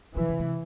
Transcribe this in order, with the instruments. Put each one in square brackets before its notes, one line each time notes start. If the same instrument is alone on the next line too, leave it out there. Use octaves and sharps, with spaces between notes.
[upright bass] C3 [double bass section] E3
[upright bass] C#3
C3